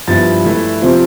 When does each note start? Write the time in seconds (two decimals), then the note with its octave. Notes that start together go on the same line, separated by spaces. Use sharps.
0.07 G2 F3 B3 E4 A6
0.45 E3 A3 E4
0.81 C3 F3 C4 F4